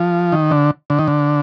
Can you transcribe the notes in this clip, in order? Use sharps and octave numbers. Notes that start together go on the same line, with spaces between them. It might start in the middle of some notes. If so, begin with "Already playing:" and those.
Already playing: F3
D#3
D3
D3
D#3
D3